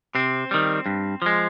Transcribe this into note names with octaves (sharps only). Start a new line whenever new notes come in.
C3 C4
D#3 G3
G2
F3 G#3